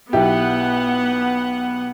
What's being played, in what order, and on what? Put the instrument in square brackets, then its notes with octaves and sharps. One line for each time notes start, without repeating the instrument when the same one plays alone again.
[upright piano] B1 E4 G4 [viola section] B3 F#5